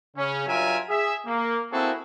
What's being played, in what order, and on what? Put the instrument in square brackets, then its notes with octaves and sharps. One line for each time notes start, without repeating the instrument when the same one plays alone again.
[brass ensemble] C#3 C#4
G2 F#3 F4 A#4 E5 G#5
G#4 E5
A#3
A#3 C4 E4 F#4 G#4 A4